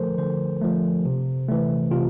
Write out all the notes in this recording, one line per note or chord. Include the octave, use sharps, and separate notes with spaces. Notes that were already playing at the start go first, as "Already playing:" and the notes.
Already playing: D3 F3 A3 A4 A#4 C5
D3 C5
F3 A3
C3
E3 A3
C3 F4